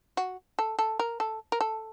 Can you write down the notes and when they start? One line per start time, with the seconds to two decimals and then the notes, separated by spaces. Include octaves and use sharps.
0.17 F#4
0.59 A4
0.79 A4
0.99 A#4
1.20 A4
1.52 A#4
1.61 A4